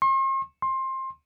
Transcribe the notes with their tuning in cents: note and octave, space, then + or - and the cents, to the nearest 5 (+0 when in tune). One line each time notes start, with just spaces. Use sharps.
C6 +45
C6 +20